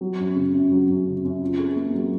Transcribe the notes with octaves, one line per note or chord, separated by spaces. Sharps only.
F#3
F#2
C#3
F#2
F#3
F#2
C#3
F#2
F4
G#4
A#3
F#3